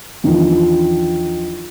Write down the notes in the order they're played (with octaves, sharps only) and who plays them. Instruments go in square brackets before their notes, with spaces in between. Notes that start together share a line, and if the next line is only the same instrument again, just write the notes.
[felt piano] E2 D#3 F3 D4